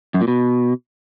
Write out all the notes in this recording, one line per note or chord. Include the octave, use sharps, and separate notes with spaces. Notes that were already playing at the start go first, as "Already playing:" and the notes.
F#2
A#2
B2